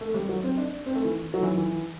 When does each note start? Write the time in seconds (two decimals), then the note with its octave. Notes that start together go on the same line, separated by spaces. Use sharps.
0.01 A3
0.14 G3
0.29 F#3
0.44 C4
0.57 D4
0.86 C4
0.95 A3
1.05 E3
1.34 F#3
1.42 E3
1.57 E3